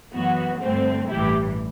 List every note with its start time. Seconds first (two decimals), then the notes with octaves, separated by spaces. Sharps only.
0.15 F#2 E3 B3 F#4
0.62 G2 D3 A3 C4
1.10 A1 G2 E3 E4 G4